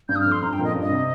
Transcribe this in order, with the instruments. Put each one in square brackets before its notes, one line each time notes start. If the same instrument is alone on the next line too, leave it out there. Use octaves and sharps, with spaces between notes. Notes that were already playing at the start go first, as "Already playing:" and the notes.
[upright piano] G2 [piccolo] G6
[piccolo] D#6
F6
[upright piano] F2
[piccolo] C6
[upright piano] G2 [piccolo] A#5
[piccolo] G5
[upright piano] F2 A#2
[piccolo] D#5
[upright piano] A#2
G2
[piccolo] D#5
[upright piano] C3